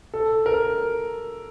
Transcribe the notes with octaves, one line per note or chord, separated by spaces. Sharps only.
A4
A#4